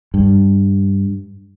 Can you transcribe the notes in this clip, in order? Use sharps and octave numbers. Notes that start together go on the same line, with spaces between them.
G2